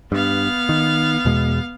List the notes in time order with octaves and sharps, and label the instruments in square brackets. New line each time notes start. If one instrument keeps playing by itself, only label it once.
[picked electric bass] G2 [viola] B3 F5
[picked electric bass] D#3
E2 B2 G#3